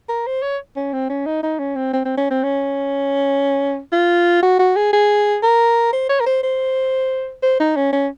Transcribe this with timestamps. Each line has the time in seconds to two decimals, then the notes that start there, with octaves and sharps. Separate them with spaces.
0.09 A#4
0.27 C5
0.42 C#5
0.76 C#4
0.93 C4
1.09 C#4
1.26 D#4
1.43 D#4
1.59 C#4
1.76 C4
1.93 C4
2.05 C4
2.18 C#4
2.31 C4
2.43 C#4
3.93 F4
4.43 F#4
4.59 F#4
4.76 G#4
4.93 G#4
5.43 A#4
5.93 C5
6.09 C#5
6.20 A#4
6.26 C5
6.43 C5
7.43 C5
7.60 D#4
7.76 C#4
7.93 C#4